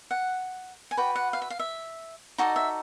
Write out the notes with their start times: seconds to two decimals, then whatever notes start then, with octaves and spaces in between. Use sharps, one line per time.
0.11 F#5
0.91 G#5
0.97 F#4 B4 D5 G5
1.15 F#5
1.33 F5
1.42 E5
1.50 F5
1.59 E5
2.38 D#4 F#4 A4 D5 D#5
2.56 E5